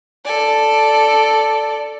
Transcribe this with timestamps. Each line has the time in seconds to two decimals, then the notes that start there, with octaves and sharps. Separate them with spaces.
0.25 A4 D5